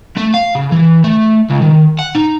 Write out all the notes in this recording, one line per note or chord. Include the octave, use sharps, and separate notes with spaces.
A3
F5
C#3
E3
A3
C#2
D#3
F#5
D#4